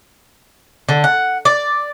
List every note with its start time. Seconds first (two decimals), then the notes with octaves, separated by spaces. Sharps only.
0.89 D3
1.04 F#5
1.45 D5